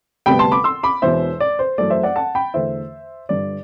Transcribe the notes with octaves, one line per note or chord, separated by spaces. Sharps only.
D2 C3 G3 B3 G5 B5
A5 C6
B5 D6
C6 E6
B5 D6
E1 E2 B2 C5 E5
D5
C5
F#2 E3 A3 D5
C5 E5
D5 F#5
F#5 A5
G5 B5
E2 D3 A3 C5 E5
G1 G2 D3 D5